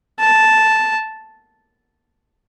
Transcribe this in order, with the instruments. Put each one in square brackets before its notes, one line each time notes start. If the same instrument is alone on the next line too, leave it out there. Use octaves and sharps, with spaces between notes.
[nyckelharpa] A5